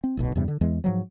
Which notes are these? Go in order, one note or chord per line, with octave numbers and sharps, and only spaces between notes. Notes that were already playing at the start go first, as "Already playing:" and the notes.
C4
D1 B1 B2
E2 G2 C3 G3
D3
E2 E3 G#3
G#2 F3 F#3